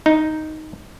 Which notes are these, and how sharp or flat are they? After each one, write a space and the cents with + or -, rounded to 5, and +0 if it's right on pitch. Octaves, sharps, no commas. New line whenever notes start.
D#4 +0